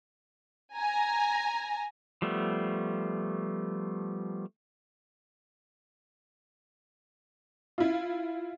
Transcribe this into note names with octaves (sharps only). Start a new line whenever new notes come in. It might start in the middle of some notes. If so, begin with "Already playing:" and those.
G#5 A#5
F3 G3 A3 B3
E4 F4